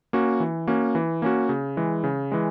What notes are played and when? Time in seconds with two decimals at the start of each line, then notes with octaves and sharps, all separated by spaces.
0.13 A#3 C#4 F#4
0.40 E3
0.67 A#3 C#4 F#4
0.95 E3
1.22 A#3 C#4 F#4
1.49 C#3
1.77 E3 G#3
2.04 C#3
2.32 E3 G#3